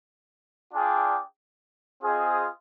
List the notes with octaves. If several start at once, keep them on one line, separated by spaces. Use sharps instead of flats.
D4 F4 G#4 D5 G5
C4 F4 G#4 C5 D#5